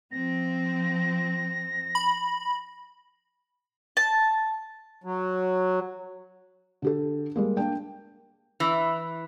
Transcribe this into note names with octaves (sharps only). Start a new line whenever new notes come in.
F3 C4 A#6
B5
A5
F#3
D3 G4 A4
G3 G#3 A#3
A#3 D4 G5
E3